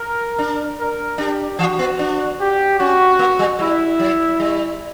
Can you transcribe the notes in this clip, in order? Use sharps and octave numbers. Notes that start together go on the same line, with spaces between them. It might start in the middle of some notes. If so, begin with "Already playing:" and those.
Already playing: A#4
D4
A#4
D4 G4
E3 F#4
B3
D4
G4
C#4 F#4
A#3
G3
G3 E4
F#3
G3